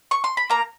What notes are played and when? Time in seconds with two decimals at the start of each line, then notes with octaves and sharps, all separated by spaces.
0.11 C#6
0.24 C6
0.37 B5
0.50 A#3 A#5